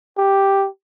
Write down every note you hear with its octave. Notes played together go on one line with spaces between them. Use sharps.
G4